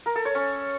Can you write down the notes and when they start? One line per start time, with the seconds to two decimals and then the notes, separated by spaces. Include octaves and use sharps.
0.06 A#4
0.16 A4
0.25 C#5
0.35 C#4